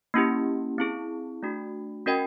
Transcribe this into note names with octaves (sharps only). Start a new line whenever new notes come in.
A#3 C#4 E4 G4
C4 E4 G#4
A3 D4 F#4
C#4 F#4 A#4 D#5 G5